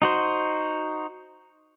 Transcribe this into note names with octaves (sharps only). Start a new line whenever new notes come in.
D#4 F#4 C5